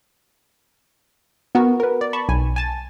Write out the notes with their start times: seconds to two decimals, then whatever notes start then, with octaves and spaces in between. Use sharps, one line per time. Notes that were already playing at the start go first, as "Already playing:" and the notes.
1.55 B3 F#4 A#4
1.80 A#4 B4
2.01 D5
2.13 A5 B5 C#6
2.29 B1 G#5
2.56 G#5 A5 A6